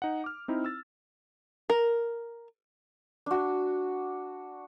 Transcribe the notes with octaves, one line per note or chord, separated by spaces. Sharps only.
D#4 F#5
D6 F6
C4 D#4 E4
E6 A6
A#4
D4 F#4